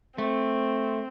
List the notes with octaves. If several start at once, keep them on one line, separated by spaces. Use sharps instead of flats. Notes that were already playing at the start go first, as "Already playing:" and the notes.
A3 C4